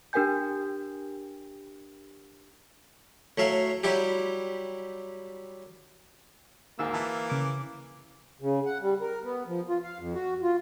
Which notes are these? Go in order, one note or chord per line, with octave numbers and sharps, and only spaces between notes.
D4 G4 A#4 G5 G#5 G6
A2 F#3 E5 F5
F#3 G3 E4 G4
D2 G#2 A#3 E6
E3 E5 A5
C#3 D6
C#3
F#5
G3
A#4
B3
F3
F4
F5
F2
F#4
F4